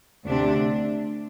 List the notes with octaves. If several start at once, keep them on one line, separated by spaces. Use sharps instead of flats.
D2 C3 D4